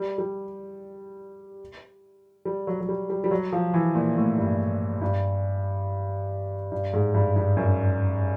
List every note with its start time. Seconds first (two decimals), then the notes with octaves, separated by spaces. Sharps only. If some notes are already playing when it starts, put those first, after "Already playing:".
Already playing: G3
0.18 G3
2.45 G3
2.67 F#3
2.80 F#3
2.89 G3
3.10 G3
3.24 G3
3.31 F#3
3.53 F3
3.74 E3
3.95 A#2
4.17 A2
4.38 G2
5.02 G2
6.72 G2
6.93 G#2
7.14 G2
7.36 G2
7.57 F#2